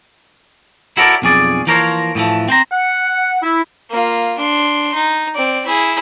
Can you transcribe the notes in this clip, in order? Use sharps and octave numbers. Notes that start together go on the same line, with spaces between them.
E4 F#4 A4 A#4 C#5 D5
B1 F2 C#4 G#4 D5
E3 F3 A#3 A#4 C5 C#5
A2 E3 F3 A3
C4 C5 A#5
F#5
E4
A#3 F4
D4 C6
D#4
C4 D5
E4 G#4